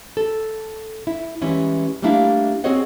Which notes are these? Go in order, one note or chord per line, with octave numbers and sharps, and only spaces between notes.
A4
E4
E3 G3 G#3 C#4 E4
G3 A3 A#3 D4 E4 F5
C4 F#4 G#4 C#5 D#5 F#5